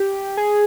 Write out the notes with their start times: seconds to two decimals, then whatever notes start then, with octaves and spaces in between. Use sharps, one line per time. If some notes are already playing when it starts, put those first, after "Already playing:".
Already playing: G4
0.37 G#4